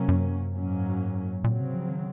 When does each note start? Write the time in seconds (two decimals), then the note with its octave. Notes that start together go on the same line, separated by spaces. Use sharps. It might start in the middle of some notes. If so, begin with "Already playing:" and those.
Already playing: C3 F#3 A#3 C#4
0.08 F#2
0.54 G#2 F#3 A#3 C#4
1.44 A#2 C#3 F#3 C4
1.60 C3
1.74 F3
1.90 D#3